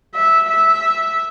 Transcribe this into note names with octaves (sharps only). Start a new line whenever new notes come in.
E5
E5